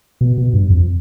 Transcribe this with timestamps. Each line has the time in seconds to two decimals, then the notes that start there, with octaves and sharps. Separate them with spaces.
0.21 B2
0.38 B2
0.53 G2
0.70 F2